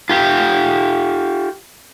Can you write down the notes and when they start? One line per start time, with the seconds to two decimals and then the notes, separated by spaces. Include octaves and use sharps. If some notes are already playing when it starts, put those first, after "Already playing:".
0.09 F4 G4